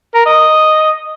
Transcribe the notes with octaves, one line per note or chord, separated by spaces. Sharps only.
A#4
D#5